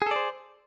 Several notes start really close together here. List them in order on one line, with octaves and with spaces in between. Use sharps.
G#4 A4 D5 C5